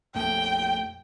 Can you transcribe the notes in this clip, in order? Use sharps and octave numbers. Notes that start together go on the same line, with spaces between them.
A#1 F2 A3 G5